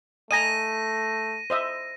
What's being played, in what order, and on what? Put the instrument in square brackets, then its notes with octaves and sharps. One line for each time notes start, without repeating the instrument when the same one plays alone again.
[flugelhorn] A3 [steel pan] D#5 G#5 A#5 [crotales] A#6 D#7
[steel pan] C5 D#5 E5